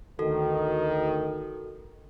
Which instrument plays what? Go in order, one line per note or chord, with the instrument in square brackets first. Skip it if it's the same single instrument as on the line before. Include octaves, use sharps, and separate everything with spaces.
[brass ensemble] D2 D#3 [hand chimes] F#4 A4